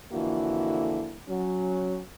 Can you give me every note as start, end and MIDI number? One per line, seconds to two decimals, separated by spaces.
0.12 1.16 41
0.12 1.16 50
0.12 1.16 52
0.12 1.16 58
0.12 1.16 64
0.12 1.16 66
1.29 2.01 54
1.29 2.01 61